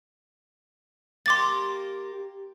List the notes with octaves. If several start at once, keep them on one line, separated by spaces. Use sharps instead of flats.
A#3 G4 C6 D6 A6